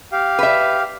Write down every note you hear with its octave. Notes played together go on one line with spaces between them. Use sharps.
G4 F5
B4 E5